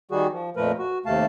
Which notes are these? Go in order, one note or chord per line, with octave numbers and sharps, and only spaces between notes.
D#3 G3 F#4 G#4
F3
F2 A#2 F3 A3 A#4 B4
F#4
D#2 C3 A3 F5 A5